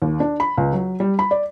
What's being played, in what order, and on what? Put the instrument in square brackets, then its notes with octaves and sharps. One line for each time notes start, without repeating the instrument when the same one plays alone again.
[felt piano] D#2
D4
B5
C#2
F#3
G3
B5
D5